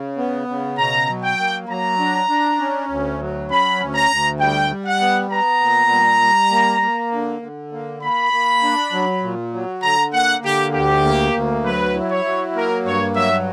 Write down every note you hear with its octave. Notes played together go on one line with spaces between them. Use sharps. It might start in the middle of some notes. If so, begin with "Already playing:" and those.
Already playing: C#3
B3
C#3
B2 A#5
F#3
G5
A#3
F#3 A#5
D4
D4
C#4
D2
F#3
C#4 B5
D2
A#5
D2
G3 G5
G3
F#5
B3
B3 A#5
A#2
G3
G3
A#3
A#3
D3
D3
A#3
A#3 B5
A#3
D4
F#3
A#2
F#3
D3 A#5
A#3 F#5
D3 G4
D2 G4
A#3
D2
F#3 B4
E4
C#5
F#3
A#3 A#4
G2 C#5
F#3 E5